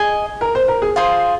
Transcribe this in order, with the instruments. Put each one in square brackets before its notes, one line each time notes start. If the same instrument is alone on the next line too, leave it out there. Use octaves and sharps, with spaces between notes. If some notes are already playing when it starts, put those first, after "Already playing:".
Already playing: [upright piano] G#4 [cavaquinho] D#5 G#5
[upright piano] A#4
C5
A#4
G#4
[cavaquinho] F4 G#4 C5